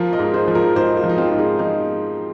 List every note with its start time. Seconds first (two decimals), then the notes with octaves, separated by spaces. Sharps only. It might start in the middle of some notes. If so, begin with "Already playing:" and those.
Already playing: F3 F4 A#4
0.13 A#4 D#5
0.19 G#2
0.34 G#4 C5
0.48 F3
0.55 F4 A#4
0.75 G#2 G#4 C5
0.97 F4 A#4
1.04 F3
1.09 D#4
1.17 C4 F4
1.32 G#2
1.39 D#4 G#4
1.59 F3 D#4 G#4